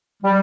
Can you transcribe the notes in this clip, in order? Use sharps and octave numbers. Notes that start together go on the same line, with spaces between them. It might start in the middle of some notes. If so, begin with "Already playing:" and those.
G3